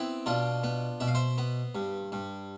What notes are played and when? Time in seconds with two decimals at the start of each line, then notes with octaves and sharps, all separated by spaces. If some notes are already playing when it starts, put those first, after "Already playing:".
Already playing: B3 C4 E4
0.26 B2 D4 F4
0.63 B3
1.00 B2 E5
1.08 F5
1.15 C5 E5
1.38 B3
1.75 G2
2.12 G2